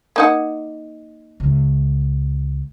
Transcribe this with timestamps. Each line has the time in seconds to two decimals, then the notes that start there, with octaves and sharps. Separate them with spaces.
0.16 A#3 D#4 F#5
1.40 C#2